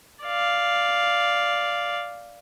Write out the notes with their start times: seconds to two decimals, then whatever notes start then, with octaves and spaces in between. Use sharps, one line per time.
0.23 D5 F5